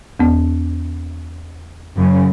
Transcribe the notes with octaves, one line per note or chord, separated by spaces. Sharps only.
E2 B3
F#2 C#3